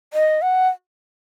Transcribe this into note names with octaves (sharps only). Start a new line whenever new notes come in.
D#5
F#5